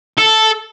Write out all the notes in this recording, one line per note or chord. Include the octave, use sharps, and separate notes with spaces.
A4